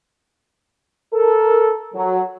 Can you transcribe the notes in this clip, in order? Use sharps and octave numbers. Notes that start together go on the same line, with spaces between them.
A4 A#4
F#3